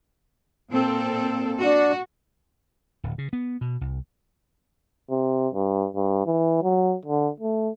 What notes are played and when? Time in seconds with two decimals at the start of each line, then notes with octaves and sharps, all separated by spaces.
0.72 A#2 C4 A4
1.61 D4 F#4
3.04 D1
3.18 C#3
3.33 B3
3.61 B2
3.81 C2
5.10 C3
5.54 G2
5.95 G2
6.25 E3
6.62 F#3
7.05 D3
7.40 A3